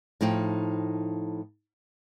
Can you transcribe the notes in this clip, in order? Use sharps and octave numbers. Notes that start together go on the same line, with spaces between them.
A2 F3 D#4 G5